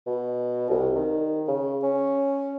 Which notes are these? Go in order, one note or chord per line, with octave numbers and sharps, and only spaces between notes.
B2
C2
D#3
C#3
C#4